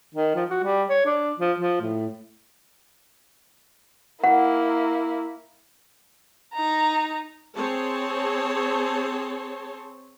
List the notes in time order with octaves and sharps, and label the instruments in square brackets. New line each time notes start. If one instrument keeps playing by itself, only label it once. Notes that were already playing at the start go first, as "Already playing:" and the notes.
[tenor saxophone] D#3
F3
F#4
G3
C#5
D4
F3
F3
A2
[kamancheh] A#3 E4 [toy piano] F#5
[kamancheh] D#4 A#5
[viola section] C4 G#4 C#5 A5 C6